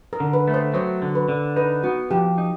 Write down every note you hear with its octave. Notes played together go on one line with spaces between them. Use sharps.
A#4
D3
B4
A3
C5
F#3 C5
D3
B4
D3
D#4 B4
B3 F#4
F3 G4
D#4